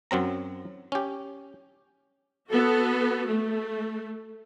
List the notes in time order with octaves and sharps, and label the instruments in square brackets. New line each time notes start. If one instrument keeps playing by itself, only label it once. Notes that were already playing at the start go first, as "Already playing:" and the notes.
[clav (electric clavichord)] F#2 F#3 C4 A#5
C#4 G4
[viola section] B3 F#4 A4
A3